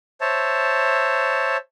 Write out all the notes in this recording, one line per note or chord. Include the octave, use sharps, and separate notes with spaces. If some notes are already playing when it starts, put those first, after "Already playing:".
C5 C#5 E5 A5